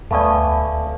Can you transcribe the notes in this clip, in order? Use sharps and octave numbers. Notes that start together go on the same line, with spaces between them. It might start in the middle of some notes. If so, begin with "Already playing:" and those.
D2 A3 B3 D5 F5 G#5 A5